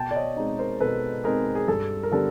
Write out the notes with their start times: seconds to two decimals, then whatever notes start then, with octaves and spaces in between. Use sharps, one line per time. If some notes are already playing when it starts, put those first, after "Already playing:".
Already playing: B2 G5 A5
0.11 D5
0.16 C#5 D#5
0.37 G#3 C4 D#4
0.59 A#4 C5
0.80 B2 A4 B4
1.24 G#3 C4 D#4 G#4 A#4
1.55 G#4
1.68 G2 A4
2.03 A#4
2.11 D3 G3 B3 D4 A4